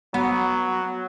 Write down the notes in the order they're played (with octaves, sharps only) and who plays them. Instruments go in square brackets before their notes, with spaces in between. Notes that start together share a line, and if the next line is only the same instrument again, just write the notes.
[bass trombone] F#3 [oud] B3